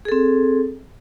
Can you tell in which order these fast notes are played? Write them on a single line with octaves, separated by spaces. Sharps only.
G#4 A4 C4